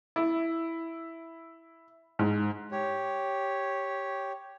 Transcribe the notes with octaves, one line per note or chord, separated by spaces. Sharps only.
E4
G#2
G4 C#5